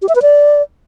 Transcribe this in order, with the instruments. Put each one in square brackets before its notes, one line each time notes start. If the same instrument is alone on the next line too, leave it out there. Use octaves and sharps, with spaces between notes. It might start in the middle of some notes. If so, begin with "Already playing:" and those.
[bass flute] G4
E5
B4
D5